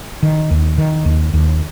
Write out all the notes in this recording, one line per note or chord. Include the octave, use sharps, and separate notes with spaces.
D#3
D#2
D#3
D#2
D#2